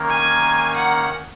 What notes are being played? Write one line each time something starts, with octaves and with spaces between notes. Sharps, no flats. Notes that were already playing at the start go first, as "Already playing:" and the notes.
Already playing: D#3 A#3 C#4
G#5
F#5